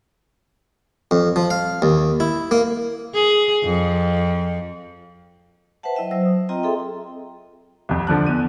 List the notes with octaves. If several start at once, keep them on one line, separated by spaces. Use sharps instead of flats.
F2
F3
F5
D#2
E4
A#3
G#4
F2
B4 C5 E5 F#5 A5
F#3 E4 D#5 E5 G5
F#3 C5 E6
D#6
C4 F4 D#5 G5 A#5
G#4 A4 E5 G5 C6 D#6
C2 F2
D3 F3 D4 F#6
E2 D#7